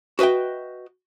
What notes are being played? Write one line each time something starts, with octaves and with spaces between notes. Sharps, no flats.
F#4 B4 D#5 E5 G5